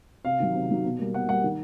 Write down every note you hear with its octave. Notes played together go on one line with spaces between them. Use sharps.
C3 F5
D#3 F#3
C3
D#3 F#3
B2
G3 A#3
B2 F#5
G3 A#3 F#5
D#3